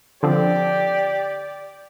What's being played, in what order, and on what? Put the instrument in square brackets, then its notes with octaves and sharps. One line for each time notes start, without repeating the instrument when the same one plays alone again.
[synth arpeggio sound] D3 F3 C4 [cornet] G4 [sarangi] D5